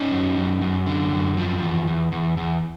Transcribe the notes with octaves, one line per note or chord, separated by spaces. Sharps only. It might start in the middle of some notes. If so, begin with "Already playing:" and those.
Already playing: C#4 D#4
F#2
F#2
F#2
D3
F#2
F3
E2
E2
E2
E2